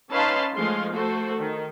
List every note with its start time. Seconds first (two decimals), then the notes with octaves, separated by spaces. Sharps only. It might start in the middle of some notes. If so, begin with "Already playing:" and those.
0.11 C#4 D#4 B4 F5 A5 C6
0.54 F3 G#3 A3 F5 C6
0.93 A3 F#4 A4 C5
1.39 D#3